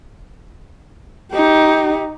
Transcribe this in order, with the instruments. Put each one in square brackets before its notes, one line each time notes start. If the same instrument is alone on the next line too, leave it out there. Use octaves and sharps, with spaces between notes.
[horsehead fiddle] D#4 G4